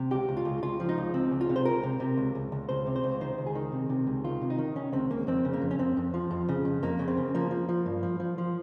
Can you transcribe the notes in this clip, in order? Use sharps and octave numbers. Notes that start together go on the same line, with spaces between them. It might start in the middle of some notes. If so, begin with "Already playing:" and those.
Already playing: C3
C#2 G4
C#2
F4
C#2
C#2 F4
F3
D#4
C#2
C#2 C4
C#2
F4
C3
C5
C#2 A#4
C3
C3
C#2
C#2
C#2
C#2 C5
C3
C5
C#2
D#3 C5
C#2
G#4
D#3
C3
C3
C#2
D#3 F4
C3
D#4
D#3
D#3 C#4
C#2 C4
C#2 A#3
F2 C4
C#3
A#3
F2
C#4
F2 C4
F2
F3
F2
C#3
F2
F2 A#3
C#3
C4
C#3
F3 A#3
F3
F3
G2
F3
F3
F3